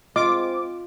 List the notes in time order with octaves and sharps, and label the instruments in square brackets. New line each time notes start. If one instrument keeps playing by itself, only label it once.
[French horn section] G#3 C4 [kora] F4 [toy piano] D#5 [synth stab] D6